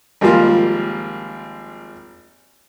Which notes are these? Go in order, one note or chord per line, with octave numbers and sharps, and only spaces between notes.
G#1 F3 G3 A#3 F4